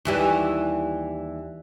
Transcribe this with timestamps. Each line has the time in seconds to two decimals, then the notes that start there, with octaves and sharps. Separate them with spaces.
0.05 D#2 E3 G3